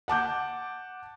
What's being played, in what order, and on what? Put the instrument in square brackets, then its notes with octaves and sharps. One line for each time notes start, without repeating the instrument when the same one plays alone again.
[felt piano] F#5 A5 D6 G6